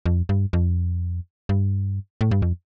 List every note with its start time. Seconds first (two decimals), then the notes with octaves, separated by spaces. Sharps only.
0.06 F2
0.29 G2
0.53 F2
1.49 G2
2.21 A2
2.31 G2
2.42 F2